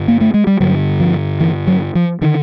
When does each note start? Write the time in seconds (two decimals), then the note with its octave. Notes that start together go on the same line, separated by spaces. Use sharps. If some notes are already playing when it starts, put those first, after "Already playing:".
Already playing: G2 D3
0.08 A#3
0.21 A3
0.34 G#3
0.47 G3
0.60 G2 D3 F#3
1.00 F3
1.40 E3
1.67 F#3
1.95 F3
2.21 D3 D#3